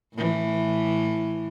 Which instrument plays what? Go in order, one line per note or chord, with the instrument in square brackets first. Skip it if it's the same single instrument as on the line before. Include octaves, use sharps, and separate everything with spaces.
[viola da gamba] A2 E3